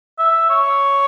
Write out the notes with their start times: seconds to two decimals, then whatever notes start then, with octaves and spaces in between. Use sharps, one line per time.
0.19 E5
0.50 C#5